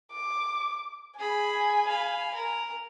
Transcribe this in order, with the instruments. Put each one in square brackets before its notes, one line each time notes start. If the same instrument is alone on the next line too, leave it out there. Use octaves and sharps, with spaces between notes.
[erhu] D6
[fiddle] G#4 B5 [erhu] G#5
[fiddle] F5 B5
A#4